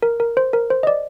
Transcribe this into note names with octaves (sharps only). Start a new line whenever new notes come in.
A#4
A#4
C5
A#4
C5
D#5
D5